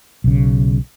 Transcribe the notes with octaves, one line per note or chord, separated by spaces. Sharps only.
B1 C#3